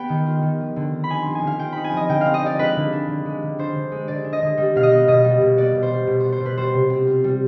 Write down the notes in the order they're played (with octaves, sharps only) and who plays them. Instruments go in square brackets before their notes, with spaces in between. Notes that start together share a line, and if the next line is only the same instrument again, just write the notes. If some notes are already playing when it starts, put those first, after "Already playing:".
Already playing: [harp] B3 G5 B5
D#3
F4
D#3
F3
D3
C4
B5
D#4 G#5
F3 C6
G#5
D3
F5
C4 G5
D#4 B5
G#5
F3 D#5
D3 G5
C4 F5
D#5
D#4 D5
G#3 B4
D3
D4
D3
G#3
D3
D4 C5
D3
G#3
D3 D5
D4
D#5
D3
G3
B2 F5
D#5
B3
B2 D#5
G3
B2
B3 D5
B2
C5
G3
B2
B3 C5
C5
B2
B4
G3 C5
C3
C4
F4
G3